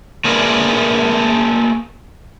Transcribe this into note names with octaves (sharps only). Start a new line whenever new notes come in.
A3 A#3 G#4 A#4 B4 D5